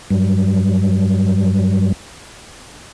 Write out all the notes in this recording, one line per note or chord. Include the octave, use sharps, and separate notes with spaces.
G2 F#3 G3